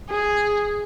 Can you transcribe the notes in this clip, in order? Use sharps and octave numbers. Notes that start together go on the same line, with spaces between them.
G#4